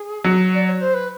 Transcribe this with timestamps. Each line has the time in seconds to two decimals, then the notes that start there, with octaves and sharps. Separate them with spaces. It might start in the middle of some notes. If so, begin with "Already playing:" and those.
Already playing: G#4
0.24 F#3
0.54 D5
0.67 C#5
0.81 C5
0.94 B4